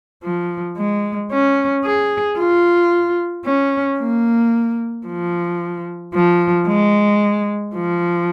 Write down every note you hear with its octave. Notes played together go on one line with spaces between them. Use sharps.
F3
G#3
C#4
G#4
F4
C#4
A#3
F3
F3
G#3
F3